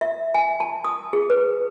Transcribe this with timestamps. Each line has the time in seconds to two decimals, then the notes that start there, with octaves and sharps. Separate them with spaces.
0.01 E5
0.34 G#5
0.60 A5
0.84 D#6
1.13 G#4
1.30 B4